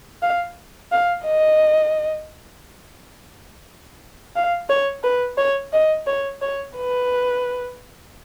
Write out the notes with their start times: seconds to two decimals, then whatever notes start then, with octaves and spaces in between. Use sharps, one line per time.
0.22 F5
0.92 F5
1.25 D#5
4.36 F5
4.70 C#5
5.04 B4
5.38 C#5
5.73 D#5
6.07 C#5
6.42 C#5
6.76 B4